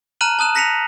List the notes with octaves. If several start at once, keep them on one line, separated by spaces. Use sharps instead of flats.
A5 A#5 F6 F#6 D#7 F#7
A5 D#6 F#6 E7
F#6 A#6 B6 C#7 E7 F7